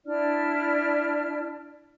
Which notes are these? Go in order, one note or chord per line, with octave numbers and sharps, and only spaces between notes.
D4 E4 D5 F6